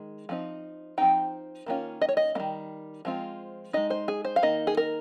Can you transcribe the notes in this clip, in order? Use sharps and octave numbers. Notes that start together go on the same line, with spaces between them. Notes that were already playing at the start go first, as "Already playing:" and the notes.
Already playing: D#3 G#3
F3 C4 D#4
F3 C4 D#4 G5
D#3 A#3 C#4 F4
D#5
C#5
D#5
D#3 G3 A#3
F3 G#3 C4 F4
G#3 D#4 D#5
C5
G#4
C5
F5
D#3 A#3 D#4 D#5
G#4
A#4